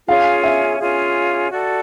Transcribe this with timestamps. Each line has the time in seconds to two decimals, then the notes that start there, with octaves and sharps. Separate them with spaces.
0.08 C#4 F4 G#4 F5
0.43 E5
0.79 C#4 F4 G#4
1.52 F#4 A4 D5